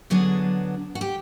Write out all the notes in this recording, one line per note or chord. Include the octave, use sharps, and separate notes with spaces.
D3 F#3 B3 D4 G#4
F#4
G4